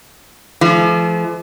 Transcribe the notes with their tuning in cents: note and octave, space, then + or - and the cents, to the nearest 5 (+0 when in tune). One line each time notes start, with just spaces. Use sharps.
F3 -40 A3 -45